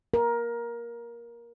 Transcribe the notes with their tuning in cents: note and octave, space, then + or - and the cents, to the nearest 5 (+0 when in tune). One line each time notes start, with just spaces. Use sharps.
A#4 +15